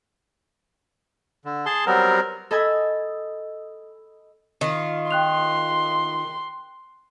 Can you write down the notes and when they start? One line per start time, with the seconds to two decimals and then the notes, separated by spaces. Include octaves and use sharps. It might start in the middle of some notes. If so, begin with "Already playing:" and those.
1.45 D3
1.66 G#4 A5 C6
1.87 F#3 G3 B3 C4 A#4
2.51 A4 D#5 G#5 B5 E6 G#6
4.61 D#3 F4
5.11 G5 C6 F#6 F7